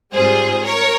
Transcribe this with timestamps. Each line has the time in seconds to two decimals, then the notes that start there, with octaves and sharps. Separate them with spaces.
0.13 G#2 G3 C4 F4 G#4 C5
0.65 A#4 C#5